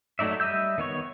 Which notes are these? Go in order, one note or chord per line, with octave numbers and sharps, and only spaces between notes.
F#3 A3 D#4 D5 E5
G3 D#5 E5 E6 G6
D#3 B3 C#5 C#6